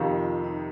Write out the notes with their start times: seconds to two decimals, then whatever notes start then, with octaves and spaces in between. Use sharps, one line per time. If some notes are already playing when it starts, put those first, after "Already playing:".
Already playing: F2 C3 D#3
0.17 F4
0.44 D#4